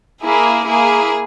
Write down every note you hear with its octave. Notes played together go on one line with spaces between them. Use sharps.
A#3 E4 G#4
A#3 E4 G#4